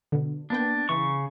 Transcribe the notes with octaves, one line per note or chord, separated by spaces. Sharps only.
B2 D3
A#3 B3 D4 G5
C#3 E3 C#6